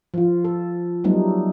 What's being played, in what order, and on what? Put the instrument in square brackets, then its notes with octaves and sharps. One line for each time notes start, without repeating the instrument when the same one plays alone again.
[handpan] F3 F4
A4
F#3 G3 A3 B3 D#4